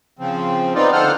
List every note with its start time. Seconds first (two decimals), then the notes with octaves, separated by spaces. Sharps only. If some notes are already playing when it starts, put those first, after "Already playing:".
0.19 C#3 F3 C4
0.75 B3 C4 D#4 F4 D5
0.93 D2 F4 A4 C5 F#5 F6